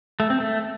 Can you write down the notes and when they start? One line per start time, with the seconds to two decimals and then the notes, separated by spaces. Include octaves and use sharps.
0.20 A3
0.30 C4
0.40 A3